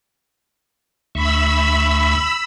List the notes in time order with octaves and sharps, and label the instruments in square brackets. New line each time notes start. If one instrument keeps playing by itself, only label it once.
[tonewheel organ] D2 E5 C#6 [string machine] B5 E6